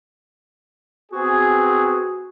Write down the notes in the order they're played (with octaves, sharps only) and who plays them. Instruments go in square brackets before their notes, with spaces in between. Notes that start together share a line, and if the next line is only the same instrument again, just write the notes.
[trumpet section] B3 C4 G#4 [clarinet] F#4